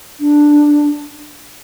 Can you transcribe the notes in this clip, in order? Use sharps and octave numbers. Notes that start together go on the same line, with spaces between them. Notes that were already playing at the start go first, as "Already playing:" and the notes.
D4